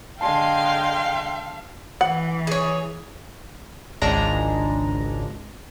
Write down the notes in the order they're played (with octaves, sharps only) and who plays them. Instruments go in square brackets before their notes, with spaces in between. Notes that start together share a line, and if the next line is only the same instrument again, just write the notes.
[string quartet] D3 G#3 C6 [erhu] F5 [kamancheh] G5 [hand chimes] A5
[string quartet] E3 [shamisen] F#5
[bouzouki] G#4 C#5
[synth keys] G#1 C#2 G#3 D4 A#5